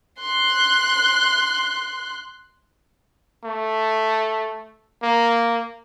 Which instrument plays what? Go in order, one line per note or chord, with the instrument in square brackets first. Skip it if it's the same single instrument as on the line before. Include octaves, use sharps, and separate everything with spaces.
[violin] C6 F#6
[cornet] A3
A#3